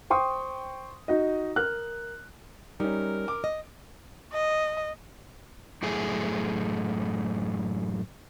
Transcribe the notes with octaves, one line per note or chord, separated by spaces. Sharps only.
C5 G5 C6 C#6 D#6
D#4 F#4 D#5
A#4 F6 F#6
G3 C#4 D#4 A#4
D6
D#5
D#5
F#2 A2 A3 G#4